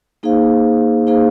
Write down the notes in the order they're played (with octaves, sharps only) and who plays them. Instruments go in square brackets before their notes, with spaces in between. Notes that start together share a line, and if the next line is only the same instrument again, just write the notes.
[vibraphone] A#3 D#4 G#4 C5 F5
A#3 D#4 G#4 C5 F5